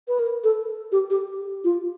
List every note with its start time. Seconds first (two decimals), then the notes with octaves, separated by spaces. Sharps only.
0.08 B4
0.19 A#4
0.44 A4
0.92 G4
1.10 G4
1.64 F4